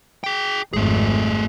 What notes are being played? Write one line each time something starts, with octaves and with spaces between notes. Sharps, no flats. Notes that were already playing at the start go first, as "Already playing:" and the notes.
G#4 G5
G#1 F2 A3 G#4